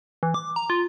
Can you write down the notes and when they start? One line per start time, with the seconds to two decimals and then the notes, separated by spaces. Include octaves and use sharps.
0.23 E3
0.34 D6
0.56 A#5
0.70 F4